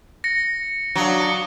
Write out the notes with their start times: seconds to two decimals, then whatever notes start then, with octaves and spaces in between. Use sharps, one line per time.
0.24 A#6 C#7
0.95 F#3 D4 F5 D#6